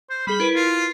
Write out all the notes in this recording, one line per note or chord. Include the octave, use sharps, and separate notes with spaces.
C5
G3 G#4 B5 G7
E4 A#4 B4
F4